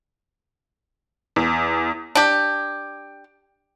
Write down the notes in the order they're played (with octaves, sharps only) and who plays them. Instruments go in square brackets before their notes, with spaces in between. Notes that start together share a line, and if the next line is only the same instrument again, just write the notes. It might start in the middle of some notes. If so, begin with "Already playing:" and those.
[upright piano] E2
[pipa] D4 G4